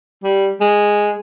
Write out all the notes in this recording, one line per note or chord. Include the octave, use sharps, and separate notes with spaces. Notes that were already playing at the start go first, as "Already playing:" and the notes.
G3
G#3